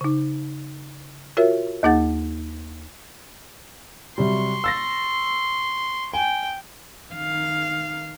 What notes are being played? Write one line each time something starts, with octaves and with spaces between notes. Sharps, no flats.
C#3 D#4
F4 F#4 A#4 C#5 E5
D#2 A#3 D#4 G#4 F#5 A6
C3 F#3 G3 C6 C#6
E6 A6 A#6
G5 G#5
D#3 F5